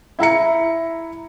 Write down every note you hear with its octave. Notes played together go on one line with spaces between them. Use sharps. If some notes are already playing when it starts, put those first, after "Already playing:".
E4 E5 A#5 C#7